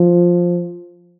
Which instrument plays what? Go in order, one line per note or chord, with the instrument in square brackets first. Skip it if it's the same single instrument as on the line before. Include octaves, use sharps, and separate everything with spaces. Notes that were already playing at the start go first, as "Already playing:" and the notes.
Already playing: [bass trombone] F3